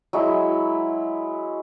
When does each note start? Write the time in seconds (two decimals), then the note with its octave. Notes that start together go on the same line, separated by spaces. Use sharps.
0.13 F#3 G#3 E4